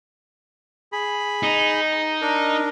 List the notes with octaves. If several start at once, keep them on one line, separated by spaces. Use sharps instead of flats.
G#4 B5
D#4
D4 A#4